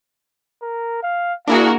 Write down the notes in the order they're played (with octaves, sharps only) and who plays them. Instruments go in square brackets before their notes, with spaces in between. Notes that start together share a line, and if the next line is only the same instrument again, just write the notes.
[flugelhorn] A#4
F5
[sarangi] A#3 [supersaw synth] D4 E4 G#4 [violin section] F#4 A#4 [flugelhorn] F5